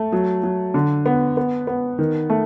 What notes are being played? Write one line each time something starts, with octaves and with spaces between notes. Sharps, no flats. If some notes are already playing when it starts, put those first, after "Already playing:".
Already playing: A3
F#3
F#3
D3
B3
B3
B3
D#3
A3